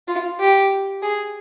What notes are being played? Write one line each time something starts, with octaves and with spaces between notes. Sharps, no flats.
F4
G4
G#4